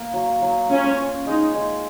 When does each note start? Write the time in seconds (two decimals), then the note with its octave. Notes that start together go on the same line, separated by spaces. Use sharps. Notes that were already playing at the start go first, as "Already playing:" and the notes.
Already playing: A#3
0.14 F#3
0.42 F#3
0.70 C#4 F4
0.98 C#5
1.26 G#3 D#4
1.54 G#3